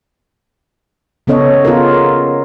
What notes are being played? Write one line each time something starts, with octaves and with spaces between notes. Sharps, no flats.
C#3 B3 C#4 A4 C#5 D#5
B3 F4 G#4 A#4